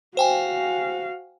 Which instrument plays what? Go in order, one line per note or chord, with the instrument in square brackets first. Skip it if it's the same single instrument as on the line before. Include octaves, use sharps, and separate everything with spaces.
[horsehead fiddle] F#4 F5 [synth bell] C5 G5 G#5